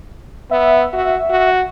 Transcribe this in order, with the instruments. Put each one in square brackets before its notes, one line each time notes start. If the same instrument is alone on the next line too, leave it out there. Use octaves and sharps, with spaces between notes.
[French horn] B3 [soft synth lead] E5
[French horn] F#4
F#4